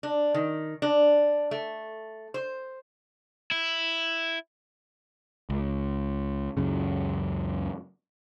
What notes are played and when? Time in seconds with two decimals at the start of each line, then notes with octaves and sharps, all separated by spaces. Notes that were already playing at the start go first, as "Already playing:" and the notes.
0.03 D4
0.34 D#3
0.82 D4
1.51 A3
2.34 C5
3.51 E4
5.50 C#2
6.57 C#2 F#2 C#3